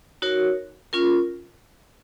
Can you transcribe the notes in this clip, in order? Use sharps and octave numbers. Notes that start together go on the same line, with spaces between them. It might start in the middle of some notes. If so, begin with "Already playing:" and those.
D#4 F#4 A#4 C#5
C#4 F4 A#4